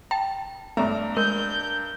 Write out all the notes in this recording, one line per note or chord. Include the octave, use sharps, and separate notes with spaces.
G5 A5
G2 A3 D4 A#5
G#3 A#4 G6